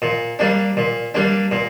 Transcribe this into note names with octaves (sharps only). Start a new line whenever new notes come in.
A#2
G3 A#3 D4
A#2
G3 A#3 D4
A#2